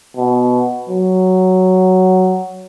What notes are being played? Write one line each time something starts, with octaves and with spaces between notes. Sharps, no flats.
B2
F#3